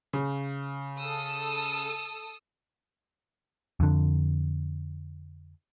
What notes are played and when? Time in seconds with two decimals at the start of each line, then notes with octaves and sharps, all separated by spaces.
0.13 C#3
1.01 A4 D#6 E6
3.80 F2 D3